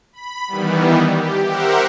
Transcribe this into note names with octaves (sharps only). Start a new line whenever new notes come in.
B5
D#3 E3 G3 B3
G4
G4 A#4 C5 E5 F#5